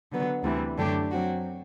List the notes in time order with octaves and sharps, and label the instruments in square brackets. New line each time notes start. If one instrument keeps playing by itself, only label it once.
[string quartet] D3 F#3 B3
D2 C3 E3 G3
F#2 D3 A3 D4 G4
F#3 C4 F#4